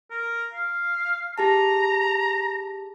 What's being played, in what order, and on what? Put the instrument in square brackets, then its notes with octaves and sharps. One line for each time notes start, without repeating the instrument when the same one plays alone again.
[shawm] A#4
F5
[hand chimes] G4 G#4 A5 [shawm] A#5